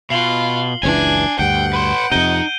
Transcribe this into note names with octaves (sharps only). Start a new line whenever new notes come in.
B2 F4 C7 F#7 G7
F#1 C#2 E3 D4 G#5
D2 G2 F#5 G5 G6 D7
B4 C6
F2 C3 D#4 G6 D#7 G7